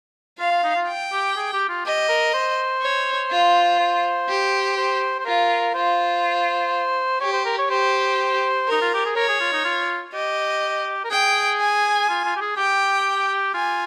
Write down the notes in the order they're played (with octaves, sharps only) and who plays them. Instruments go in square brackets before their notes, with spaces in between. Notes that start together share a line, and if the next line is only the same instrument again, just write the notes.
[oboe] F4 [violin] F5
[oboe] F4
D#4
F4
[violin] G5
[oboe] G4
G#4
G4
F4
[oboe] G4 [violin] D#5
[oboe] A#4
C5
[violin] C#5
F4
[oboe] C5
[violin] G4
[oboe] C5
C5
[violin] F4 [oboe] A#4
[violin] F4 [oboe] C5
[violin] G4 [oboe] C#5
[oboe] C5
A#4
C#5
[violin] G4 [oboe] C5
[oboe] D#4 [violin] A#4
[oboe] F4
G4
G#4
[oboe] A#4 [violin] C#5
[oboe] G#4
F4
D#4
F4
[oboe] G4 [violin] D#5
[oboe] A#4
[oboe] G#4 [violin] G5
[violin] G#5
[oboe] F4
F4
G4
G#4
[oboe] G4 [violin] G5
[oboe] F4 [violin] G#5